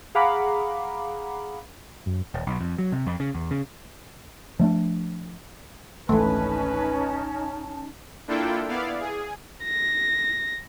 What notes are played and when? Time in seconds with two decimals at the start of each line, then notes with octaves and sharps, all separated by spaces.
0.15 G#4 F5 F#5 A#5 B5 D6
2.06 F#2
2.34 D#1
2.47 B1
2.61 F2
2.79 F#3
2.92 C3
3.06 F2
3.20 C#3
3.35 E2
3.51 C#3
4.60 F3 A3 B3 D4
6.09 G#1 C#2 E3 A3 C#4 D#4 B4 A5
8.27 A#3 D4 E4 F4 A4 G5
8.68 B3 E4 D5 F5
9.00 G#4
9.64 A#6